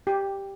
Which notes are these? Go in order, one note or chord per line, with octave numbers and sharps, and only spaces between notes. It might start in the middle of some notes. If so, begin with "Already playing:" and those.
G4